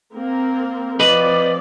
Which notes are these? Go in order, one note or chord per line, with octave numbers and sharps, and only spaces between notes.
A#3 C4 A#4
F3 C4 B4 D5 D#5 B5